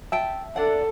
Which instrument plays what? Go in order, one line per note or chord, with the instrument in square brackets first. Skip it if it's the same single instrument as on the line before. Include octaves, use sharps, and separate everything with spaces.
[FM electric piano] E5 [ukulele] G5 A5
[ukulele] D4 D5 F#5 [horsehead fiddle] A4